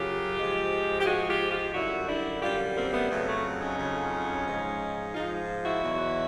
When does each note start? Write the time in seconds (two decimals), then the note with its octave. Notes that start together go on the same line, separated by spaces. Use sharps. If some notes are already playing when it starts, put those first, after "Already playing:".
Already playing: F#2 C#3 F#3 F4 G4
0.38 G#2 F3 G#3
1.00 G4
1.05 G#2 F3 G#3 F#4 G#4
1.29 F4 G4
1.51 F4 G4
1.74 F#2 D3 G3 E4 F#4
2.08 D4 E4
2.42 F#2 D3 G3 F4 G4
2.76 A#3 C4
2.93 A3 B3
3.10 F2 C#3 F#3 A3 B3
3.28 A3
3.61 C#4 D#4
3.78 F2 C#3 F#3
4.46 G#2 F3 G#3
5.14 G#2 F3 G#3 D#4 F4
5.65 E4 F#4
5.83 E2 B2 F#3